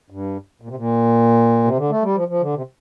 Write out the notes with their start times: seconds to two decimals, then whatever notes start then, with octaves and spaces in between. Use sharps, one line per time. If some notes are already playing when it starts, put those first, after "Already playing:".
0.10 G2
0.62 A#2
0.68 C3
0.76 A#2
1.64 C3
1.77 D3
1.90 A3
2.02 G3
2.15 F3
2.28 F3
2.41 D3
2.54 C3